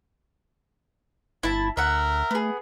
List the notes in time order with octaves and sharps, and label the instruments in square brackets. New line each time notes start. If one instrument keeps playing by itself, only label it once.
[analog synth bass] G1 [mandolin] E4 A5
[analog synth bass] D2 [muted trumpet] A#4 [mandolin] E5 F#5
[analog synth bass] A3 [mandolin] B3 G#4